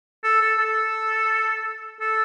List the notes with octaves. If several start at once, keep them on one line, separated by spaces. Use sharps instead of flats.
A4
A4
A4
A4